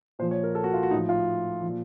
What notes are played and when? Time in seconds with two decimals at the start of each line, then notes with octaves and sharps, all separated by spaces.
0.19 A#2 F3 C5
0.31 C#5
0.44 A#4
0.55 A4
0.64 F#4
0.74 F4
0.83 F#4
0.91 A2 F3 D#4
1.09 F4
1.63 F3
1.68 A#2